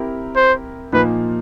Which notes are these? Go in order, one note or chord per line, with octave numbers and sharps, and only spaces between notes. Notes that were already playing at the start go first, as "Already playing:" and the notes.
Already playing: C4 E4 G4 A#4
C5
A#2 F3 A#3 D#4 B4